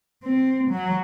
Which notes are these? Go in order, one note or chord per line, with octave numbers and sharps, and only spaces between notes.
C4
F#3